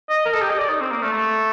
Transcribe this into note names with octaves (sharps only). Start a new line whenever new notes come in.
D#5
A#4
A4
G4
D#5
D5
D#4
C4
A#3
A3
A3